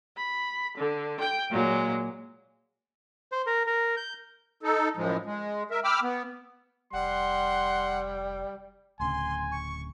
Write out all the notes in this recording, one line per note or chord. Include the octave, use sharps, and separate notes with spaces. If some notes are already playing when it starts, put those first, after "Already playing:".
B5
D3
G5
A#2 F#3 G#3
C5
A#4
A#4
G6
D#4 A4
F#2 A2 F3 G#3
G#3
A#4 E5
G5 B5 D6 E6 F6
B3
F1 G3 F#5 C6
D1 D2 C#3 G#5 C6
C#6